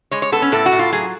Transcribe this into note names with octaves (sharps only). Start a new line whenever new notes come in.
G#3 C#5
C#5
B3 A4
C#4
A2 A4
F#4
A2
F4
F#3 G#4